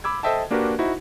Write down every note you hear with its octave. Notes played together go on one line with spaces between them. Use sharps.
B5 D6 E6 G#6
A4 C5 D#5 E5 G5 A5
A#3 D4 F#4 G4 A#4 B4
D#4 E4 F#4 C5